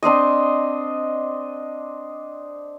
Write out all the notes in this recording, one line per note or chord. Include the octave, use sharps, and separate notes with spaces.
C4 D4 C5 D#5